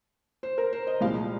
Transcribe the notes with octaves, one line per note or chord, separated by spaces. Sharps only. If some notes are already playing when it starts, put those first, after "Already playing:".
C5
A#4
C5
D#5
C2 A#2 F3 G#3 F5